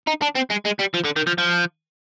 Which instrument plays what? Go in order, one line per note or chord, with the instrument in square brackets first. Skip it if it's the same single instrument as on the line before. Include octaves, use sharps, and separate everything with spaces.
[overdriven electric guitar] D#4
D4
C4
G#3
G#3
G3
F3
D3
D#3
F3
F3